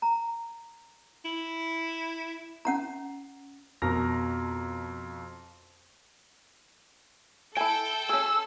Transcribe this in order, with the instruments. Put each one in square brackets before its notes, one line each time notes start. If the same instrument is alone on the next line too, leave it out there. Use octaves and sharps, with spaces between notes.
[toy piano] A#5
[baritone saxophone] E4
[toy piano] C#4 F#5 A#5
[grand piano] F2 B2 A#4 F6 A#6
[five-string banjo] E4 G#5 [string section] A4 [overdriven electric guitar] G5
[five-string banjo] C#4 G#4 [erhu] E6